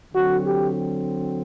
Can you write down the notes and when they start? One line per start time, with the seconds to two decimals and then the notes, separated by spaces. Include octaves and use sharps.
0.14 D3 F#3 C4 F#4
0.45 G4